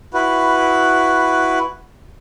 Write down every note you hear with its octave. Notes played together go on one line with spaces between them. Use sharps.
E4 F#4 B4